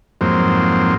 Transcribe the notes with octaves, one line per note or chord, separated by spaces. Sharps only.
F2 G#2 F#3 A#3 C4